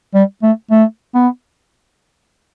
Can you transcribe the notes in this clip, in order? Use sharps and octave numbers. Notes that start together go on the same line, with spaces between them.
G3
A3
A3
B3